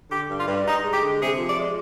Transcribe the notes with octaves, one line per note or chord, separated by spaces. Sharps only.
D3 G4
G2
F4
G2
G2 D#4
G#3
G4
D3
C3 G#4
F3
D5
G#3